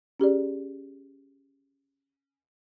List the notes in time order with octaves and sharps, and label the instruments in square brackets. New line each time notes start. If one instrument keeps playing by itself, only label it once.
[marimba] C#4 G4 G#4 D5